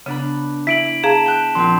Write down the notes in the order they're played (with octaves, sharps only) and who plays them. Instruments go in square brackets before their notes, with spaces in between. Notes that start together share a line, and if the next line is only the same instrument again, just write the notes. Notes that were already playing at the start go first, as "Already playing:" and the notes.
[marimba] C#3 [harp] B3 D4 B5
[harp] E4 [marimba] E5 [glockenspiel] B6 D7 F#7
[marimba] G#4 F5 A#5 [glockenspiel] A5 E7
[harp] G5 F#6
[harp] A#1 C4 [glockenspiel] C6